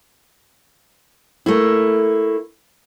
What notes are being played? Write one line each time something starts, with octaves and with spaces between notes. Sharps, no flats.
A3 A#3 E4